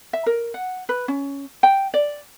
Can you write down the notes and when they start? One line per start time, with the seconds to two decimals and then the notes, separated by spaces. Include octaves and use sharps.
0.13 E5
0.26 A#4
0.54 F#5
0.89 B4
1.08 C#4
1.63 G5
1.94 D5